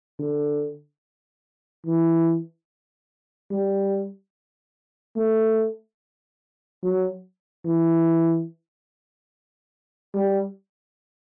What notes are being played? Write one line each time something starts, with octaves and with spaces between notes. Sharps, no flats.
D3
E3
G3
A3
F#3
E3
G3